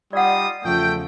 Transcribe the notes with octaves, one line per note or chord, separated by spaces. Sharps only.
G3 D#4 F4 D5 F#5 D#6
E2 C#3 F3 A3 G5